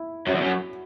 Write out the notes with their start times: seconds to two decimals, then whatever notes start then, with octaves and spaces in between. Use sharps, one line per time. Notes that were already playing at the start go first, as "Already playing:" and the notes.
Already playing: E4
0.27 F#2 F#4
0.35 E2
0.41 F#2